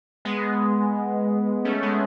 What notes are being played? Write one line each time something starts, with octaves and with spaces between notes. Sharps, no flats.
G#3 B3
A3 C#4
G#3 B3